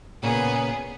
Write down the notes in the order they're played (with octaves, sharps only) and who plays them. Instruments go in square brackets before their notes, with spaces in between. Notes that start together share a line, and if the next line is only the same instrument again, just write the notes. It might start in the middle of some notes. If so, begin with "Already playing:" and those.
[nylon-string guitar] A#2 C#3 C#5 [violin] B3 G#4